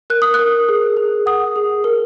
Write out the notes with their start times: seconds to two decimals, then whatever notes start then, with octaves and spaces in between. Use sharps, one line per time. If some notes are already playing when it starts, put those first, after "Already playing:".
0.10 A#4 F#6
0.22 D#6
0.34 A#4 F#6
0.69 G#4
0.97 G#4
1.26 F#5 D#6
1.56 G#4
1.84 A#4